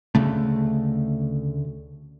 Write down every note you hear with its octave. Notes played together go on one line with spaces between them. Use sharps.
D2 C#3 A3